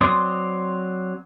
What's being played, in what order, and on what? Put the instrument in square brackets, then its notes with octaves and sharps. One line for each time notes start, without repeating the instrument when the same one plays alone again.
[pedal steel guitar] F#3 C4 D5 C6 D#6